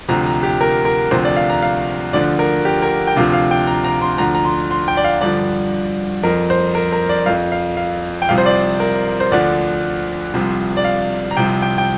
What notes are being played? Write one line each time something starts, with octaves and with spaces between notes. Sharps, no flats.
D2 C3 F3 A#5
A#5
G4
A#4
A#4
D2 C3 F3 C5
D5
F5
A#5
F5
D2 D3 F3 D5
A#4
G4
A#4
G5
D2 C3 F3 F5
F5
G5
A#5
A#5
C6
D2 D3 F3 A#5
A#5
C6
C6
G5
D5
F5
G2 D3 F3 D5
F2 F3 A#4
C5
A#4
A#4
D5
F2 F3 F5
F5
F5
G5
C2 C3 F3 F5
C5
D5
A#4
C5
D2 D3 F3 D5
C2 C3 F3
D5
F5
A#5
C2 C3 F3 G5
G5
G5